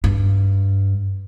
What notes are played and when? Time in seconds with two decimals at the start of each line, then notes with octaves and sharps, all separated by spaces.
0.04 G2